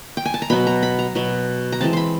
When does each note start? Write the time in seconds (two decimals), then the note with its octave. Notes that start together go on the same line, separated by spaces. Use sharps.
0.17 G5
0.25 G#5
0.34 A5
0.42 A#5
0.50 B2 F#3 B3 B5
0.67 A#5
0.83 B5
0.99 A#5
1.15 B2 F#3 B3
1.72 A#5
1.81 E3 G#3 C4 A5
1.93 B5 C6